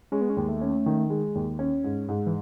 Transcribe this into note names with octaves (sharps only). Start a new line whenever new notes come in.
G#3 C#4
B3
C#4
D#2
A3
C#4
D#3
G#3
D#2
C#4
G#2
G#2
E3